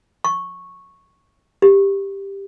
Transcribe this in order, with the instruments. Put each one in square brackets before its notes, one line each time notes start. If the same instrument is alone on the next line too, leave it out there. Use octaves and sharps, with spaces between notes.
[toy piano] C#6
G4